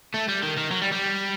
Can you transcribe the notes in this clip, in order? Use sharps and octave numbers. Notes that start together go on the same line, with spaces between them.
A3
G3
D#3
D#3
F#3
G3
G3